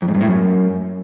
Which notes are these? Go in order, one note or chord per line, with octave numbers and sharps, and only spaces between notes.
F2
G#2
G2
A2
F#2